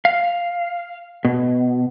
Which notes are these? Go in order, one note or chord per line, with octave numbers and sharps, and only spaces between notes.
F5
B2